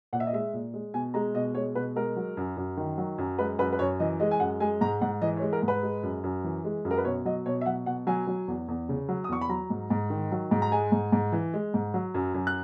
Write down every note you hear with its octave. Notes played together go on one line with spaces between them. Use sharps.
A#2 F#5
E5
D#5
G#3 E5
A#2
G#3
B2 G#5
G#3 A#5
B2 D#5
G#3 C#5
B2 B4
G#3 A#4
F#3
F#2
F#2
D#3
F#3
F#2
G#3 B4
F#2 B4
B4
F#2 C#5
E3 D#5
G#3 D#5
G#5
F#2 F#5
G#3 G#5
G#2 A#5
G#2 F#5
E3 D#5
C#5
G#3
A#4
G#2
B4
G#3
F#2
F#2
E3
G#3
F#2
A#4
B4
B2 C#5
F#3 D#5
B2 C#5
E5
F#3 F#5
B2 F#5
F#3 G#5
F#3
E2
E2
C#3
F#3
D#6
E2 C#6
B5
F#3 A#5
G#2
G#2
D#3
F#3
G#2
A#5
G#3 G#5
G#2
G#2
E3
G#3
G#2
F#3
F#2
F#2
F#6